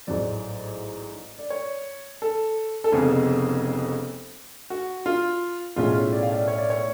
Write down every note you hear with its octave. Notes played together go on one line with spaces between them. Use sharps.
A1 G#2 F#3 D5
D5
C#5
A4
A4
F1 F2 C#3 G#3 B3 G#4
F#4
F4
B1 A2 G#3 C#4 F4
D5
F5
D5
C#5
D5
C#5